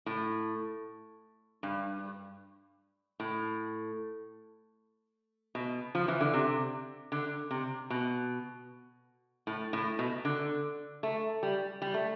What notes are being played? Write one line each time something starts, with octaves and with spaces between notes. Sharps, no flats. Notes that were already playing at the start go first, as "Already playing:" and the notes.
A2
G2
A2
B2
F3
E3
D3
C3
D3
C3
B2
A2
A2
B2
D3
A3
G3
G3
A3